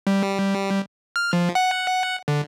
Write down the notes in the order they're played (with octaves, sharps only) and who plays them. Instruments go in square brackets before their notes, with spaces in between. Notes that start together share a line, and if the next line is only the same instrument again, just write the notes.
[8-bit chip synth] G3
F6
F3
F#5
D3